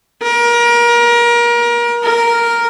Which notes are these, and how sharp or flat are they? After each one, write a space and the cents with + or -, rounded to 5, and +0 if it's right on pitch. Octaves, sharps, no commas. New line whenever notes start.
A#4 +30
A#4 +0